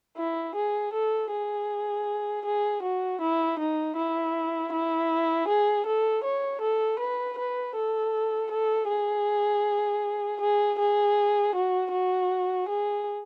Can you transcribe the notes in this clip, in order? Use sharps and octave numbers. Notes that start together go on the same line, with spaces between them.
E4
G#4
A4
G#4
G#4
F#4
E4
D#4
E4
E4
G#4
A4
C#5
A4
B4
B4
A4
A4
G#4
G#4
G#4
F#4
F#4
G#4